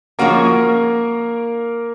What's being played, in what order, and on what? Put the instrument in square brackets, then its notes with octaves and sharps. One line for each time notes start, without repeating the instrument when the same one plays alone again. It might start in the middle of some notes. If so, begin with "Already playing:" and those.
[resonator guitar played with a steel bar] F#2 F3 G#3 C#4 F#4 [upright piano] A#3 A#4